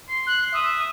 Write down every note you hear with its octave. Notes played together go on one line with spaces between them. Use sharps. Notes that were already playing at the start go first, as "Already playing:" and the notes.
C6
F#6
E5 D#6